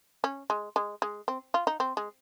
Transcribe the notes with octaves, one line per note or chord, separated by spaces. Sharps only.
C#4
G#3
G#3
G#3
C4
F4
D#4
C4
G#3